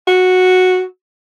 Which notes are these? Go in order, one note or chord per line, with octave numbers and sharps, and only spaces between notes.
F#4